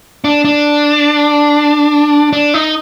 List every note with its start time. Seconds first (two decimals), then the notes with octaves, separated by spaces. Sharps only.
0.24 D4
0.45 D4
2.33 D4
2.54 D#4